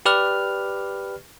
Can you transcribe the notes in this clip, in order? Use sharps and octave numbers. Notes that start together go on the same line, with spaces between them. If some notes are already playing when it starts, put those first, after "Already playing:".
G4 B4 D5 F6